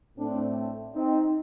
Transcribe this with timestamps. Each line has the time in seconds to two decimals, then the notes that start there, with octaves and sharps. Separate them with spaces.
0.18 A2 A3 C4 D4
0.95 C4 D#4